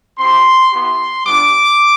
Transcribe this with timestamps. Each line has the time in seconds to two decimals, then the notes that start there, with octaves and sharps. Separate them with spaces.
0.18 C4 E4 G4 C6
0.71 B3 E4 G4 C6
1.25 G3 B3 D4 F4 D6